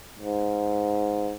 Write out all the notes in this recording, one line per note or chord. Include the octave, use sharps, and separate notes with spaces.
G#2